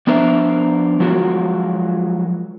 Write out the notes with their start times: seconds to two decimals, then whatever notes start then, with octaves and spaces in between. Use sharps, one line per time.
0.07 F3 B3 D4 A#4 C5 E5
1.00 F3 F#3 G#3 F4 F#4 A#4